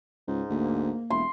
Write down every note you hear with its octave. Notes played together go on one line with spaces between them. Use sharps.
C#2 G#2
D2 A#3
E1 E4 C6